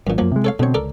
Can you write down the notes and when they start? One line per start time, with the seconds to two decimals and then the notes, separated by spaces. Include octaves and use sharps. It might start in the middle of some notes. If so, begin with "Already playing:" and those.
0.07 G#1 F#2 A#2
0.18 F#2 F3 F#3 A#3
0.32 C3 G#3
0.44 A4 C#5 F5
0.59 B2 D3 C4 C#5
0.74 C#2 A4 A#4 D5